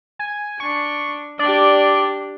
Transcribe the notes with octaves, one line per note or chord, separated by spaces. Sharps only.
G#5
D4 C#6
D4 G4 D5